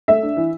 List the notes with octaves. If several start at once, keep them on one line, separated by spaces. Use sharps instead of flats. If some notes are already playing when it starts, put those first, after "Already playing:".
A3 E5
D4
E3